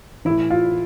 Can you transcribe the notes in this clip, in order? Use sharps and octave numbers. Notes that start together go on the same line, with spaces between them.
A2 E3 E4
F4